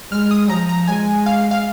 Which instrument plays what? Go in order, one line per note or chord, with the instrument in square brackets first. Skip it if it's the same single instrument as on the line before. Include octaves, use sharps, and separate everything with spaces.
[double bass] G#3 [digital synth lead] F6
[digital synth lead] D#6
[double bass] F3 [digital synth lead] A#5
[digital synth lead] A#5
[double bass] G#3 [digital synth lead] G#5
[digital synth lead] F5
F5